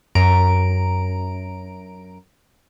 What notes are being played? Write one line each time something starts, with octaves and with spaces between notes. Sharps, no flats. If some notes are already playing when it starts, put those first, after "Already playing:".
F#2 A#5 D7